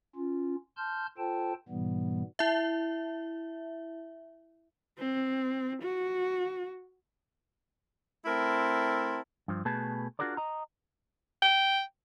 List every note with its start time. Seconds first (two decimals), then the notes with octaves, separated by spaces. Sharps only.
0.16 C#4 F4
0.77 A5 C6 F6 G6
1.18 F4 A4 C5 G5 A5
1.69 G#2 B2 E3 G3 B3
2.39 E4 E5
4.99 C4
5.83 F#4
8.26 A3 C4 E4 A#4 A5 C6
9.48 G2 F3
9.65 B2 A3 G#4 B4 A5
10.19 D4 F4 F#4 G#4 A#4 D5
10.37 D#5 A#5
11.42 G5